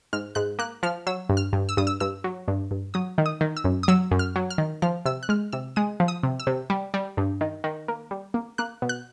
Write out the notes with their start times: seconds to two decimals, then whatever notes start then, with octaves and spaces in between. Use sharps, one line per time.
0.13 G#2 F6
0.35 G#2 F#6
0.59 A#3 F#6
0.83 F3 F6
1.07 F#3 E6
1.29 G2
1.37 F6
1.53 G2
1.69 E6
1.77 G2 D#6
1.87 E6
2.00 G2 E6
2.24 F#3
2.48 G2
2.71 G2
2.94 F#3 D#6
3.18 D#3
3.26 D#6
3.41 D#3
3.57 E6
3.64 F#2
3.83 D#6
3.88 F#3 E6
4.11 F#2
4.19 F6
4.36 F#3
4.50 F6
4.58 D#3
4.82 F3 F6
5.05 C3 E6
5.23 F#6
5.29 G#3 F6
5.53 C3 E6
5.76 G#3 D#6
6.00 F3
6.08 D#6
6.23 C3
6.40 E6
6.47 C3
6.70 G3
6.94 G3
7.17 G2
7.41 D#3
7.64 D#3
7.88 A#3
8.11 G3
8.34 A#3
8.58 A#3 F#6
8.82 B2
8.89 F#6